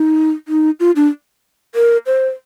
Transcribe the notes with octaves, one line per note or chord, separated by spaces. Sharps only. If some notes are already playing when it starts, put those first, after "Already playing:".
Already playing: D#4
D#4
F4
D4
A#4
C5